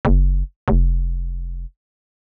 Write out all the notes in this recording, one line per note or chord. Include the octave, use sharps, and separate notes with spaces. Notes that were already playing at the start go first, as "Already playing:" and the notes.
F#1
F1